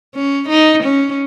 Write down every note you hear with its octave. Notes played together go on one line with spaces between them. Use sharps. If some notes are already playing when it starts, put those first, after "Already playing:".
C#4
D#4
C#4